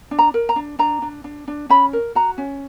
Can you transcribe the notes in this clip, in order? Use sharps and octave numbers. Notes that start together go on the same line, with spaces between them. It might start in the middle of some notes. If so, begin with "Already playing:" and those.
D4
A#5
A#4
A#5
D4
D4 A#5
D4
D4
D4
C#4 B5
A#4
F#4 A#5
C#4